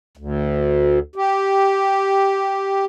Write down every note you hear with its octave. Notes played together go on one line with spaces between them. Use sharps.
D2
G4